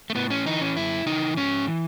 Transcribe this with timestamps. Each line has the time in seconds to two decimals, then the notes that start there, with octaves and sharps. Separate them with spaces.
0.10 A3
0.15 A2 B3
0.30 C#4
0.46 E3 D#4
0.61 C#4
0.76 F#2 E4
1.06 C#3 E3 D#4
1.37 G#2 C#4
1.67 E3